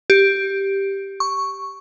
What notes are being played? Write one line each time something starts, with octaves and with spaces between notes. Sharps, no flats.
G4
C#6